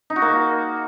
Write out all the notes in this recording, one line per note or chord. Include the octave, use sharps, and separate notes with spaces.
D#4
F#4
A#3